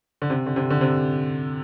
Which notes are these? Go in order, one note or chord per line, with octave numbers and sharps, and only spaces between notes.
D3
C3
D3
C3
D3
C3